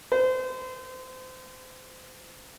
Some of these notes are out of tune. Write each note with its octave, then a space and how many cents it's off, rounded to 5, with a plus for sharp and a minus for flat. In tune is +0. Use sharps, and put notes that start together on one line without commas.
C5 -30